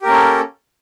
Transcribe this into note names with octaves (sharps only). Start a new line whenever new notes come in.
A#3 C#4 G4 A4 A#4